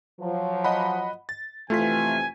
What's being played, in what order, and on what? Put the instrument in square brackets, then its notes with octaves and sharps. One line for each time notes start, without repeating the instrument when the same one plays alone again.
[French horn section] F3 F#3
[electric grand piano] D#5 F#5 B5
A6
[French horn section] F2 C3 E3 [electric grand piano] A3 F4 B6 [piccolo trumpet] G#5